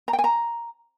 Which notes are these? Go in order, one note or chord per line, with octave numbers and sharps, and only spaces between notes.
A#5
G5
G#5
A#5